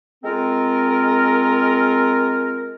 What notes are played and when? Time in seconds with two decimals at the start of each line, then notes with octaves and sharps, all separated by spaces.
0.24 G#3 C4 F4 A#4